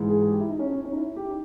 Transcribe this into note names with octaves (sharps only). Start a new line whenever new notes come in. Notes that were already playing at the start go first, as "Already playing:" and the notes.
Already playing: G#2 E3
G#4
G#4
G4
E4
D#4
C#4
C#4
C#4
D#4
E4
G4
D#4